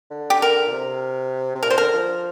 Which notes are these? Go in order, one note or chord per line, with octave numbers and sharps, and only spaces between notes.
D3
G4
A#4
A#2
C3
C3
A#2 A#4
C5
D3 A#4
F3